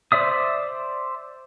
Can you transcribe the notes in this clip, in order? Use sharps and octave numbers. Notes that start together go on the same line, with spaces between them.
C5 D5 E5 D#6